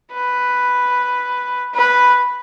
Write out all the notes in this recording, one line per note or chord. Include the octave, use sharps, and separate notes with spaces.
B4
B4